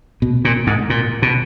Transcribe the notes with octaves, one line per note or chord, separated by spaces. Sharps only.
B2
A#2
G#2
A#2
B2